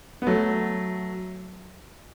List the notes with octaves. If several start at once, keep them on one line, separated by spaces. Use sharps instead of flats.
B3
F#3 A3